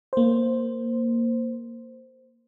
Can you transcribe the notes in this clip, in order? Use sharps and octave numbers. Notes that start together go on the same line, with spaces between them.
A#3 C5